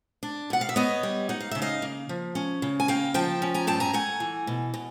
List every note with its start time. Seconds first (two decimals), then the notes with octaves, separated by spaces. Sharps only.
0.23 D4
0.50 B2 F#5
0.61 F5
0.69 E5
0.76 B3 C#5 D#5
1.03 G3
1.29 D#4 F#5
1.40 F5
1.51 C#3 E5
1.62 D#5 F5
1.82 A#3
2.09 F3
2.35 C#4
2.62 C#3
2.80 G#5
2.88 A#3 F5 G5
3.14 F3 G5 A5
3.42 C#4
3.54 G#5 A#5
3.67 G2 G5 A5
3.80 G#5 A#5
3.94 A3 F#5 G#5
4.20 E3
4.47 B2
4.74 B2